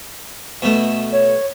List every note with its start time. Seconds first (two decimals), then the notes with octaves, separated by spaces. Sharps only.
0.62 B2 A3
1.12 C#5